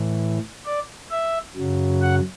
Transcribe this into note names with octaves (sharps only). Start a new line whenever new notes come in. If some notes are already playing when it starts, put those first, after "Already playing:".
Already playing: A2 E3
D5
E5
F#2 C#3 F#3
F#5